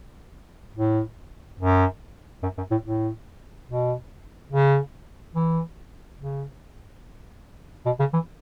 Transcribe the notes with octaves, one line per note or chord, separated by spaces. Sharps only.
A2
F#2
F#2
F#2
A2
A2
B2
C#3
E3
C#3
B2
C#3
E3